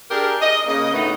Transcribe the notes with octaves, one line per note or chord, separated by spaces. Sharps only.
D4 G4 G#4 A#4
D#5
C#3 A#3 D#5
D2 A2 A3 B3 D#4 F#5